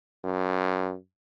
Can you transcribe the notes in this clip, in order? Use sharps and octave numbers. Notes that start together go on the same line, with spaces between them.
F#2